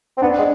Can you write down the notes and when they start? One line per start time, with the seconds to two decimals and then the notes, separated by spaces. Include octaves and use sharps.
0.17 C4
0.22 B3 D4
0.39 G#3